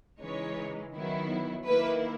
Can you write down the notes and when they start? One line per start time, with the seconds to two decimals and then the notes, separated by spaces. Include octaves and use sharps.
0.21 C#3 E3 G#3 D#4 C#5
0.93 D#3 F#3 B3 E4
1.66 D#3 A#3 E4 B4